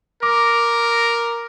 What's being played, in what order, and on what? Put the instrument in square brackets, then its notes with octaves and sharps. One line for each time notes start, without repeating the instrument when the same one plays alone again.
[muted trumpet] A#4 [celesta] D6